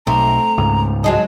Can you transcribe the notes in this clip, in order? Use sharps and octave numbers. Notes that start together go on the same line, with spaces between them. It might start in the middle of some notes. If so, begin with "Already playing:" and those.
B1 A3 C4 A#5
C#2 G#2
F#3 G#3 D#4 A5